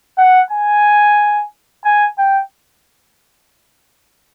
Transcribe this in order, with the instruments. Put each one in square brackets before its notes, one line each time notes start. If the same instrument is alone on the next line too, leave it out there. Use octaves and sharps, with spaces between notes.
[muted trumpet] F#5
G#5
G#5
G5